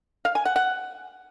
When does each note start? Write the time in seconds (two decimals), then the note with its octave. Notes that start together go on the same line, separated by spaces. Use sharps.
0.25 F5
0.35 G#5
0.45 F#5
0.56 F#5